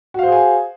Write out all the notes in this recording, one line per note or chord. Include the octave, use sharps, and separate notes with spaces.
F#4 G#4 C5 F5 G#5